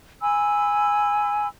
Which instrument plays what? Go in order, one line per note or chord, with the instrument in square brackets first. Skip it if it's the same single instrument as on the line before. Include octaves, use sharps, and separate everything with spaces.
[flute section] G#5 B5 E6